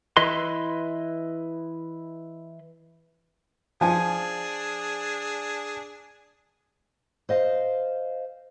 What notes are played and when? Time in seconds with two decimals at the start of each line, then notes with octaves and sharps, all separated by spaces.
0.17 E3 E4 B4 D#5 C6
3.81 F3 D4 G#4 G#5
7.29 C5 D#5 F5